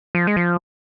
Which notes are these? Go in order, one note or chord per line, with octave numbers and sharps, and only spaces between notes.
F3
G#3
F3